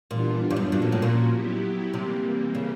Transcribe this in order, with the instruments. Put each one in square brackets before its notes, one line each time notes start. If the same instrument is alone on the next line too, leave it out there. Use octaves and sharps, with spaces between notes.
[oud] A#2 [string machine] E3 G3 B3 D4 F4
[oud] G2
F#2
[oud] G2 [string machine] A#2 F3 A#3 C#4 F#4
[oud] A2
A2
A#2
[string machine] F#3 B3 E4 G4
[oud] C3 [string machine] E3 G3 A#3
[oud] C#3